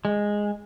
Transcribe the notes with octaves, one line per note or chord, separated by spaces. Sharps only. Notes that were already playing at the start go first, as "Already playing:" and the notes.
G#3